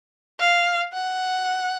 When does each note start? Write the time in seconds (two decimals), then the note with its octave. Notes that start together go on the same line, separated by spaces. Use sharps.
0.39 F5
0.93 F#5